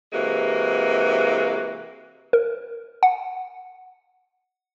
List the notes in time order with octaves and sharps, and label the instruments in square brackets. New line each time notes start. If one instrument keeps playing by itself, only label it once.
[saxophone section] C3 E3 G#3 A#3 F#4
[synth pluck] A#4
F#5